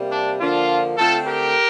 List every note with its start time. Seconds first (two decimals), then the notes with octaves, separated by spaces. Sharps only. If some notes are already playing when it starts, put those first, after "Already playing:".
Already playing: C3 G3 A#3
0.11 D4
0.40 D3 F3 A#3 D4 F4
0.97 D3 A3 C4 F4 A4
1.27 G4 A#4